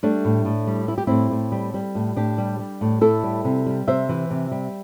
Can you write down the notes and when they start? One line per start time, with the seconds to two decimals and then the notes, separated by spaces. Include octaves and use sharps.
0.03 G3 A3 D4
0.25 A2
0.45 A2
0.67 G3
0.88 G3 E4
0.98 G4
1.07 A2 C4 E4
1.31 A2
1.52 G3
1.74 G3
1.95 A2
2.16 A2 D4 G4
2.38 G3
2.60 G3
2.81 A2
3.01 A2 E4 A4
3.24 G3
3.44 C3
3.66 G3
3.87 C3 C5 E5
4.09 E3
4.30 C3
4.51 G3